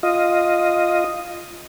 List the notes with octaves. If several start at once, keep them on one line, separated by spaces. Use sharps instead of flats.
F4 D#5